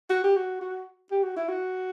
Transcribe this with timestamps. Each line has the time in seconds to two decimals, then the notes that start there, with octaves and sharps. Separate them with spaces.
0.10 F#4
0.24 G4
0.36 F#4
0.61 F#4
1.11 G4
1.23 F#4
1.36 E4
1.49 F#4